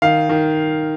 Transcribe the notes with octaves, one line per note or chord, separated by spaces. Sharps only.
D#3 F5
D#3